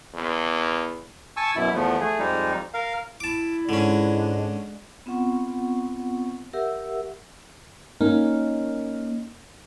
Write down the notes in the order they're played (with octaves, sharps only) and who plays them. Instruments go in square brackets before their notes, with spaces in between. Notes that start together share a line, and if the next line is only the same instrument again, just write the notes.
[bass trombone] E2
[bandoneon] G#5 A5 C#6 E6
F#2 B2 E4
E2 F3 A3 B3
A3 G#4
F2 G3 G#3 D#4
A#4 F5
[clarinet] E4 [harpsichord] A5 D6
[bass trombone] G#2 [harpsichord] D3 C#4 [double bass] G#3 D4
[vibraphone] B3 C4 F4 F#5 C#6
G4 A#4 E5 F#5 E6
[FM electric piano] A#3 [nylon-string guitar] C#4 D#4